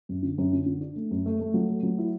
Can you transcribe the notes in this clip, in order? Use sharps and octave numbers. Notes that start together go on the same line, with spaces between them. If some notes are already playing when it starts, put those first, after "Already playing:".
F#2
D3
F#2
D3
D3
D4
A3
F#2
A3
A3
F#3
A3
F#3
E4